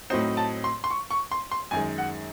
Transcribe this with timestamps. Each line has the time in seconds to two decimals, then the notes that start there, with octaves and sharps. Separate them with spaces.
0.10 A2 F#3 C4 D#4 C5
0.37 A5
0.64 C6
0.84 C6
0.91 C#6
1.11 C#6
1.32 C6
1.51 C6
1.71 F#2 D#3 G#3 G#5
1.98 F#5